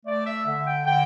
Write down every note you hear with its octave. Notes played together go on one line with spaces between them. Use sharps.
A3 D5
E5
D3 E5
G5
D3 G5